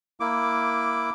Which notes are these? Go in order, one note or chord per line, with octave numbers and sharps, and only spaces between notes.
A#3 E4 D6